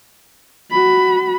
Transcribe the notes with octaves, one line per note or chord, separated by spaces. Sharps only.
F#4 B5